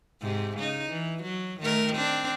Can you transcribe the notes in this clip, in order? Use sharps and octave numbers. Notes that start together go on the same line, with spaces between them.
G#2 C3
C#3 D#4
E3
F#3
D#3 A3 A#4
C4 D4